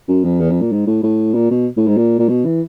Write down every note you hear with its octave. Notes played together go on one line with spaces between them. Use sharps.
F#2
F2
E2
F2
A#2
G#2
A2
A2
A#2
B2
A2
G#2
A#2
A#2
B2
E3